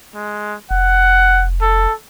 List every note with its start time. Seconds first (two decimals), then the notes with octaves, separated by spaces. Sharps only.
0.15 G#3
0.71 F1 F#5
1.61 A4